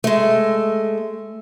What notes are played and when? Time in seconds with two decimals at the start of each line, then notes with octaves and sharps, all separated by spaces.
0.04 G#3 A3